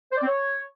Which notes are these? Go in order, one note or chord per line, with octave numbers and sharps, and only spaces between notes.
C5
D5
C4
C#5